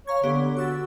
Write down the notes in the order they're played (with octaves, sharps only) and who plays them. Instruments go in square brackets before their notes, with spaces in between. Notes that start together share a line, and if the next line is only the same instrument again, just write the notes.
[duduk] C#5 [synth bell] F5 A#5 G#6
[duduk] D3 [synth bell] B3 G4
[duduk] F#4 [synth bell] C#6 E6 A6